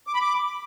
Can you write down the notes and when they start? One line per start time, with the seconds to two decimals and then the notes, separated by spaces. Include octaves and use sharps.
0.07 D6
0.14 B5
0.21 D6